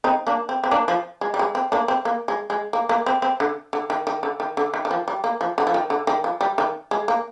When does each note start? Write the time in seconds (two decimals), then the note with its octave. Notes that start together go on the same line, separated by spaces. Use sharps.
0.04 C4 D#4
0.27 A#3 D4
0.49 C4
0.64 C4
0.71 A#3 D4
0.88 F3
1.21 G#3
1.34 G3
1.39 G#3
1.55 C4
1.72 A#3 D4
1.88 C4
2.05 A#3
2.28 G#3
2.50 G#3
2.73 A#3
2.89 A#3
3.06 C4
3.22 C4
3.40 D3
3.73 D3
3.90 D#3
4.07 D#3
4.23 D3
4.40 D#3
4.57 D3
4.74 D#3
4.85 D#3
4.91 F3
5.08 G3
5.24 A#3
5.41 F3
5.58 D3
5.67 F3
5.74 D#3
5.90 D3
6.07 D#3
6.24 F3
6.41 G3
6.58 D#3
6.91 G#3
7.08 A#3